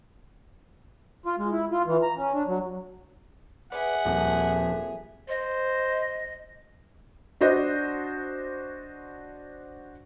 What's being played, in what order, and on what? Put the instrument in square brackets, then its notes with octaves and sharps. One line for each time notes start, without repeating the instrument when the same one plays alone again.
[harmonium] F4
G#3
E4
F4
E3
A#5
C#4
D4
F#3
[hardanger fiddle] G#4 E5 [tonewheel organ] B4 D5 [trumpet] F#5
[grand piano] D#1 [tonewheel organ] F3 C4 A4
[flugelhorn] C5 [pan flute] D#5
[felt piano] D4 F#4 C5 D#5